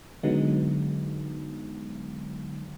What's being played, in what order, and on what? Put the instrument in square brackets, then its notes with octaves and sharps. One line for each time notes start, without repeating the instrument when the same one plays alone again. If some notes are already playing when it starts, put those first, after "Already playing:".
[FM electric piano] D3 F#3 G#3 B3 D#4